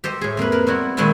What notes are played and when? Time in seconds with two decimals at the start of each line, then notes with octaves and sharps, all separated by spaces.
0.04 G4 A4 C5 D#5
0.21 A2 G#4
0.37 F2 A#3 G#4 B4
0.52 A#4 B4
0.67 G3 B3 C4 E4 F#4
0.97 A#2 D#3 G#3 A3 C4 E4